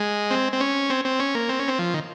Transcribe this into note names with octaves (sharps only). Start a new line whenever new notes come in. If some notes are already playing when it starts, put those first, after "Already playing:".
Already playing: G#3
C4
C4
C#4
C4
C4
C#4
A#3
C4
C#4
C4
F3
D#3